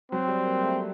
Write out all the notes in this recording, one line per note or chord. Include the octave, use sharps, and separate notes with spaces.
F#3 C4
G3
A#3
A3